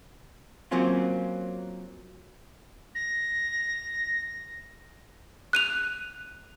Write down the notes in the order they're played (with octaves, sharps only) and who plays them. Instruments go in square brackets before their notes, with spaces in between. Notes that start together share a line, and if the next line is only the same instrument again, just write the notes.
[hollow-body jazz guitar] F#3 A#3 C4 C#4 F4
[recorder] A#6
[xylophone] F#6 D#7 F7